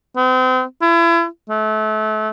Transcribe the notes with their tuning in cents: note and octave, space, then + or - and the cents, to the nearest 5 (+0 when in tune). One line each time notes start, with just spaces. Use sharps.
C4 -35
E4 +35
A3 -30